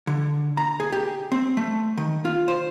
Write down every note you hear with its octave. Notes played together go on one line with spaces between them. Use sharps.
D3
A#5
G#4
G4
C4
A3
D#3
F4
C5